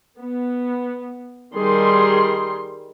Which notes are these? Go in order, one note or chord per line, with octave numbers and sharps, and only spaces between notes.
B3
D#3 G3 G#4 C6